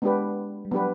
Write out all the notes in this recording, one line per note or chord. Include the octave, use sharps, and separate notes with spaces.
G#3 B3 D4 G4 B4
G3
F#3 B3 D4 G4 B4